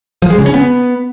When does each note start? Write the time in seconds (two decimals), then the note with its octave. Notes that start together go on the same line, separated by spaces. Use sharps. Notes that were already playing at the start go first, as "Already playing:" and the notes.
0.22 F3
0.30 G#3
0.38 C#3
0.46 C#4
0.54 B3